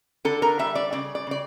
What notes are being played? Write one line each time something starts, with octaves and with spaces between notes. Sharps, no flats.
D3 A4
A#4
G3 E5
D5
C#3 D5
D5
C#3 D5